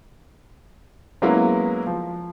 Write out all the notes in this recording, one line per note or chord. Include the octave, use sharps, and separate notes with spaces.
F#3 G#3 A#3 B3 C#4 E4
F3